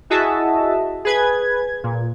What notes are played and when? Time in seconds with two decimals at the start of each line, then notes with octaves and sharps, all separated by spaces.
0.10 E4 F#4 G#4 D#5 E5 A5
1.05 G#4 B4 G#6
1.84 A#2